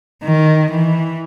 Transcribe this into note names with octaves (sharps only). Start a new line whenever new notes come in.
D#3
E3